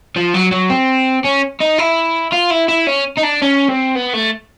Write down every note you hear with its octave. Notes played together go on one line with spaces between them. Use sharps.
F3
F#3
F#3
C4
C#4
D#4
E4
F4
E4
E4
C#4
D#4
D4
C#4
C4
B3
A3